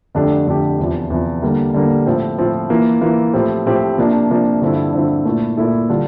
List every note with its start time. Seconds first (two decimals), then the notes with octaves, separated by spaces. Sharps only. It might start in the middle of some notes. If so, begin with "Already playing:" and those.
0.15 F2 D3 A3 D4 G4
0.47 F2 D3 A3 D4 G4
0.79 E2 C3 F3
1.10 E2 C3 F3
1.42 D3 G3 A#3
1.74 D3 G3 A#3
2.06 A2 F3 C4
2.38 A2 F3 C4
2.70 E3 A#3 F4
3.02 E3 A#3 F4
3.34 A2 F3 C4 G4
3.66 A2 F3 C4 G4
3.98 C3 F3 A#3 D4
4.30 C3 F3 A#3 D4
4.61 G2 D3 F3 C4 E4
4.93 G2 D3 F3 C4 E4
5.25 A#2 A3 E4 A4
5.57 A#2 A3 E4 A4
5.89 D3 G3 D4 F4